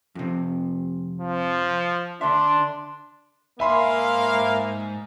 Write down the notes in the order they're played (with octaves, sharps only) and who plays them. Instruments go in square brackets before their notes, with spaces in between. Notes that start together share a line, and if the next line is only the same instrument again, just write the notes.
[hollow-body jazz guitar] F2 C3
[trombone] F3
[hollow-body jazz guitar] D3 E5 [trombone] D4 [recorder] C6
[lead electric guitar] G#2 G#5 [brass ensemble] A#3 F5 [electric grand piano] E5 B5 C6